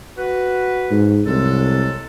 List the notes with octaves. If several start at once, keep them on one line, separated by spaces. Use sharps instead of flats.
F#4 B4
G#2
C2 F#3 G#3 A4